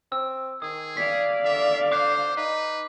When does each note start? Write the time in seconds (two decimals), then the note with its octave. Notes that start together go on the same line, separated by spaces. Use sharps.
0.12 C4 E6
0.62 D#3 G#4 D#6
0.97 D5 F5 B6
1.45 D3 E5
1.92 C5 D6 F#6 C7
2.37 D#4 B4